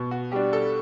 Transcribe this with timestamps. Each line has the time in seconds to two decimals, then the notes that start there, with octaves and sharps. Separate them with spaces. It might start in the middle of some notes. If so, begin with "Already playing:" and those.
Already playing: B2
0.11 F#4
0.32 G3 D4 G4
0.53 A4